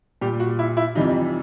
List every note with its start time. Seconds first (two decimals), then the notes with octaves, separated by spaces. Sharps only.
0.21 A#2 G3 G4
0.40 F#4
0.59 E4
0.77 E4
0.95 F2 C3 E3 G3 D#4